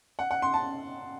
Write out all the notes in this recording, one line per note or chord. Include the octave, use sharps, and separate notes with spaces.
F#5
F#5
C6
A5